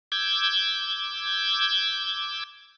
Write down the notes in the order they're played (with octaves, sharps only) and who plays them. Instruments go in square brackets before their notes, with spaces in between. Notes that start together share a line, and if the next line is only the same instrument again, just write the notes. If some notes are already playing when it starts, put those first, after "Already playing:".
[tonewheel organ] D6 E6 G6 G#6